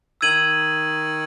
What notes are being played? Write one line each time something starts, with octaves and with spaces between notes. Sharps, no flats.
D#3 E6 G#6 D#7 F#7